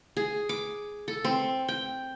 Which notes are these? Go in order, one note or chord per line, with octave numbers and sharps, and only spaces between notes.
G#4
D6
A4
C4
G5